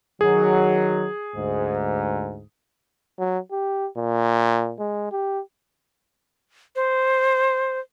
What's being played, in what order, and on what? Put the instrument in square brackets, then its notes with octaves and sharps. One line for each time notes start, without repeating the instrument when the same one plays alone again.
[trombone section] D#3 F#3 [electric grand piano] G#4
[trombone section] D2 G#2
[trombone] F#3
G4
A#2
G#3
G4
[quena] C5